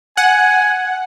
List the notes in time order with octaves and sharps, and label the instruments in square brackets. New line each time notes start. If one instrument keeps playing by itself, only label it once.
[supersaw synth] F#5 [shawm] G#5